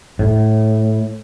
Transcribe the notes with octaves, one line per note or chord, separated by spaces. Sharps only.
A2